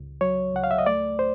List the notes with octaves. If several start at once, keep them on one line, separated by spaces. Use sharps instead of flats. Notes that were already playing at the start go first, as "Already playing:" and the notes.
Already playing: C#2
F#3 C#5
C#2 F#5
F5
E5
D#5
A3 D5
C5